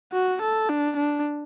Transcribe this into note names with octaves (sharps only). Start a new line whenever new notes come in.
F#4
A4
D4
D4